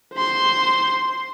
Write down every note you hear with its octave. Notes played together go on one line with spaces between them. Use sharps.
C5 C6